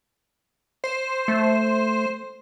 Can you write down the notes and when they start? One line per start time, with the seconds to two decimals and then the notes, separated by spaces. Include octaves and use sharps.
0.84 C5
1.28 A3